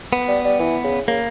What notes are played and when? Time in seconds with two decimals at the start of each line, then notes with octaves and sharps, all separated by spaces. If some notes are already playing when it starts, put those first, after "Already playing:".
0.13 B3
0.28 G3
0.45 G3
0.60 E3
0.84 C#3
1.07 C#3 A#3